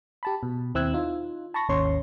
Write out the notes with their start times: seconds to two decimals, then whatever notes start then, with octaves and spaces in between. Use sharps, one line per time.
0.23 G4 A5 B5
0.43 B2
0.75 D#2 C4 E4 E6 F#6 G#6
0.93 D#4 F4
1.54 A5 B5 C#6 A#6
1.69 G#1 D#2 C#4 C#5 C6 C#6